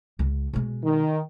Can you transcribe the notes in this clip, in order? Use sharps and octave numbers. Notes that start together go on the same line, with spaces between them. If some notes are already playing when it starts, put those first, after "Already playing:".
C#2 C#3
B2 G#3
D#3